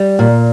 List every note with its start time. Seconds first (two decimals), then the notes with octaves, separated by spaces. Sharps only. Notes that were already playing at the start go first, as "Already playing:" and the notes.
Already playing: G3
0.19 A#2